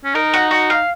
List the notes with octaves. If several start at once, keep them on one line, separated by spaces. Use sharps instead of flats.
C#4
D#4 A#4
F#4
F#4
F5